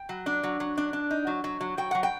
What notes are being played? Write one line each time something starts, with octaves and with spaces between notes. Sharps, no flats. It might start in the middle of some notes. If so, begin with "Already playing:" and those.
Already playing: G5
F#3
D4
F#3
F#3
D4
D4
D#4
F#3
F#3
F#3
F#3 G5
F#3 F#5
G5